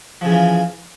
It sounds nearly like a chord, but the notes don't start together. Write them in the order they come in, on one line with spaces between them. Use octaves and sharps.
F3 C#3 E3 F4